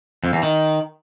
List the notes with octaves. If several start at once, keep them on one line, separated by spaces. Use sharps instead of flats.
F2
E2
D#3